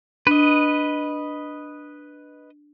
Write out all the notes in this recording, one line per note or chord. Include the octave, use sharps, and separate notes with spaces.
D4 B4 D#5